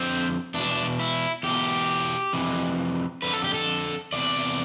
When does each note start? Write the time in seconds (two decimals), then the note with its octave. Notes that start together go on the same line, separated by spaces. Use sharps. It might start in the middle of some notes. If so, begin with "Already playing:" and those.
Already playing: F2 D3 C4
0.54 E2 B2 D4
0.99 E4
1.43 E2 B2 G4
2.33 F2 C3 E3
3.22 F2 D3 B4
3.33 A4
3.44 G4
3.54 A4
4.12 E2 C3 D5